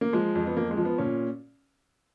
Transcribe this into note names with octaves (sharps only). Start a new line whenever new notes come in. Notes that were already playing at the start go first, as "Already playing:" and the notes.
A#3
F3 G#3
F2
B3
F2 A#3
G#3
F3
B3
A#2 C#4